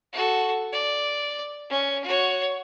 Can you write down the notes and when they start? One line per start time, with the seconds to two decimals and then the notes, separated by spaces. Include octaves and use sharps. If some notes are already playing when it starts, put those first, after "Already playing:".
0.13 F#4 A4
0.72 D5
1.70 C#4
2.04 F#4 C#5